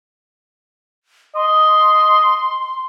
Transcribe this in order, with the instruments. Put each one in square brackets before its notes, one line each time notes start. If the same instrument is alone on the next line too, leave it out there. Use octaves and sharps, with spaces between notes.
[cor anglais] D#5 [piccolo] C6